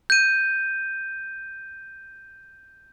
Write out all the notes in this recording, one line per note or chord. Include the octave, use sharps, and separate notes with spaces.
G6 D#7